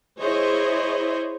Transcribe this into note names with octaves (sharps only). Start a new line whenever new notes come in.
E4 G#4 C5 C#5 D#5